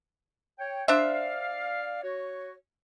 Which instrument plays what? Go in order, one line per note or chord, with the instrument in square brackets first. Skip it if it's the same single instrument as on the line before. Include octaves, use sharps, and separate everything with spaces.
[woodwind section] C#5 G5
[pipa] D4 C5 E5 [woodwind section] D5 F5
[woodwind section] F#4 C#5